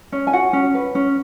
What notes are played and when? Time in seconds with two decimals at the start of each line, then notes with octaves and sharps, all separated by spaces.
0.12 C#4
0.27 G#5
0.33 F#4 F#5
0.53 C#4
0.74 B4
0.95 C#4